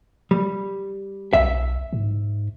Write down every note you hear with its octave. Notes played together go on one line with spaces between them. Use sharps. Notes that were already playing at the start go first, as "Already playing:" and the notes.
G3
B1 E5
G#2